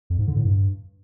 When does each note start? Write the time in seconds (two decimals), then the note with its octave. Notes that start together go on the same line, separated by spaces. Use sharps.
0.10 F2
0.19 G#2
0.27 D3
0.36 A2
0.45 G2